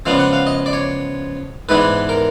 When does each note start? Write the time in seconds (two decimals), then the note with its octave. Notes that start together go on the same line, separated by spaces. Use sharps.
0.06 C#3 F3 G#3 B3 D4 F5
0.19 F#5
0.33 F5
0.47 D#5
0.66 D5
0.73 C#5
1.69 G#2 E3 G#3 B3 D4 B4
2.09 A#4